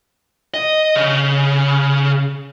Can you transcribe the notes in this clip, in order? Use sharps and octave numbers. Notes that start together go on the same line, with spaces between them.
D#5
C#3